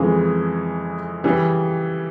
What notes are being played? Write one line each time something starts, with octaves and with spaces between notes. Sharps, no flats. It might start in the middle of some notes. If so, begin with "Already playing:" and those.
Already playing: F2 C#3 E3 G#3
C#3 E3 G3